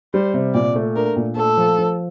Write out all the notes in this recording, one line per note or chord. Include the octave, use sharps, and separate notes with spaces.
G3 C5
C3
A#2 D5
A3
D4 A#4
A#2
A3 A4
F3
F3